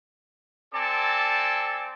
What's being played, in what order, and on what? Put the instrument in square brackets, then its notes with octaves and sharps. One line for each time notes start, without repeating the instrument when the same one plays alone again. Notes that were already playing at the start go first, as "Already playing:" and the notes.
[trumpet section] C4 A4 D5 G#5 A5 D6